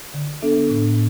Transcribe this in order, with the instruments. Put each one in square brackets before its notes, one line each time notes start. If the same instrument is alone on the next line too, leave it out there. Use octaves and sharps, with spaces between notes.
[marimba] D3
B3 D4 A4 E5
A2